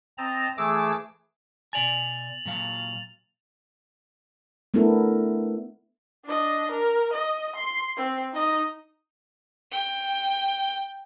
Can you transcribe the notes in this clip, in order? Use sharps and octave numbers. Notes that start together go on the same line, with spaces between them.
C4 D#5 A5 A#5
E3 A3 G#4 D6 E6
B2 D5 G#5 A6 F7 F#7
A#2 F#3 F5
A3 B3 D4 E4 A4 A#4
D4 D#5
A#4
D#5
C6
C4
D#4 D#5
G5